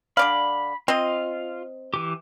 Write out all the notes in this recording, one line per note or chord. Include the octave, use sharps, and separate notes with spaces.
D3 D5 F5 B5
C4 F4 D#5
E3 G4